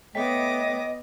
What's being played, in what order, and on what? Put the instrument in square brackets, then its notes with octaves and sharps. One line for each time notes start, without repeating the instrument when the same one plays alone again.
[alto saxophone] A3 [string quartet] B3 D6 D#6 [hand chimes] C#5 G5 B6 [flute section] D#5